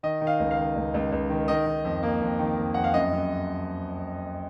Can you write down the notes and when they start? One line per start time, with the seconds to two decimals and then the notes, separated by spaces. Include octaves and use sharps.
0.03 D#3 D#5
0.21 D#3
0.27 F5
0.40 C#2
0.51 F5
0.57 D#3
0.76 C#2
0.94 C#2
1.12 C#2
1.30 D#3
1.48 D#3 D#5
1.66 D#3
1.85 F2
2.03 A#3
2.22 F2
2.39 D#3
2.58 F2
2.74 F2 F#5
2.84 F5
2.94 F#2 D#5
3.13 F#2